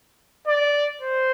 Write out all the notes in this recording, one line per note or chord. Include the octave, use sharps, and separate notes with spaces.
D5
C5